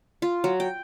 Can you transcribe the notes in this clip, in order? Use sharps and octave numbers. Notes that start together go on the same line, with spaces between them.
F4
F#3
G5